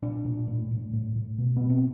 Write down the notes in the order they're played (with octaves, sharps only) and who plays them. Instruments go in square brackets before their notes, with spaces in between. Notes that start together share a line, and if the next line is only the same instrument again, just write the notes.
[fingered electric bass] A#2 D4
A#2
A2
A2
A2
A2
B2
B2 B3
C4